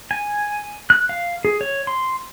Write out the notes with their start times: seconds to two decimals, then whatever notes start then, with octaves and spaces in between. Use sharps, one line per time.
0.11 G#5
0.90 F#6
1.09 F5
1.45 G#4
1.61 C#5
1.87 C6